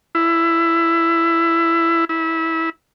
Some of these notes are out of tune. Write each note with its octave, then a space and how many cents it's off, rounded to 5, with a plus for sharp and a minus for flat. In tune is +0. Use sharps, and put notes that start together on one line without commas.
E4 +15
E4 -20